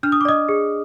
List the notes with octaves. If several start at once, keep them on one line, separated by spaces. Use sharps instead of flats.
D4 F6
D#6
D6
D5 D#5 D#6
G#4